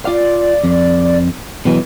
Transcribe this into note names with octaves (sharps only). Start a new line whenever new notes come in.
F4 D5 F5
F2
B2 E3 F#3 G#3